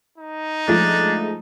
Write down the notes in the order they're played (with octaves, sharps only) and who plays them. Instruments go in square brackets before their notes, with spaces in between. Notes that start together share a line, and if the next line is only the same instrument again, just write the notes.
[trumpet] D#4
[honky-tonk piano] F3 G#3 A3 [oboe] D4